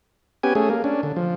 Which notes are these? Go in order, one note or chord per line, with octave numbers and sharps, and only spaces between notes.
B3 C#4 G4 G#5
A3 C#4 G#4
A#3
C#4 D4
D3
F3